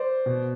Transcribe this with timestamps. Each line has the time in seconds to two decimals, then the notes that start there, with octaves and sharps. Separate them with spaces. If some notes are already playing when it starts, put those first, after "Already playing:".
Already playing: C5 D5
0.26 B2